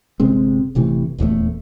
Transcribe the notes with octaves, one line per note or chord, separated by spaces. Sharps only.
G1 C3 G#3 C4
G1 C3 E3 A3
D#1 E2 D#3 A3